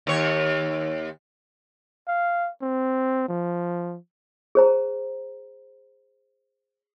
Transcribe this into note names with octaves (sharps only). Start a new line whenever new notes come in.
D#2 C#5
F5
C4
F3
G#4 C5 A#5